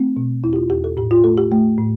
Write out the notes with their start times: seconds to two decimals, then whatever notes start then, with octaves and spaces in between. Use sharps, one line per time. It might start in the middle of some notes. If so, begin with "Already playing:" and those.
Already playing: A3 C4
0.17 B2
0.44 E2 E4
0.53 G4
0.56 F4
0.70 E2 G4
0.84 A4
0.97 A2 G4
1.11 F4
1.24 A3 A4
1.38 G4
1.52 A3
1.78 A2